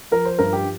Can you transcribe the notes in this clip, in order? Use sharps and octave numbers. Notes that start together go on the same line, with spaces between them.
F3 A#4
C5
G2 A#4
G4